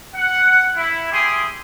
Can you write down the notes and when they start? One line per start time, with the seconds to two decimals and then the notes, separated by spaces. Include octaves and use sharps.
0.15 F#5
0.76 E4
1.11 E4 G4 G#4 C6 D#6